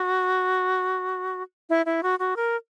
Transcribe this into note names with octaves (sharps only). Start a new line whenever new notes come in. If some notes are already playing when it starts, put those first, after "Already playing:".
Already playing: F#4
E4
E4
F#4
F#4
A#4